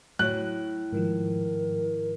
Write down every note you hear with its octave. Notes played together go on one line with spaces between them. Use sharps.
A2 F#3 C#5 F#6
G#2 D#3 F3 A#4